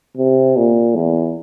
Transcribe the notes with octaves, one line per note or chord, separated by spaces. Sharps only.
C3
A#2
E2